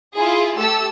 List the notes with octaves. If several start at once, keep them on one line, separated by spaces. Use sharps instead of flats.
E4 F4 G#4
A3 G4 A4 E6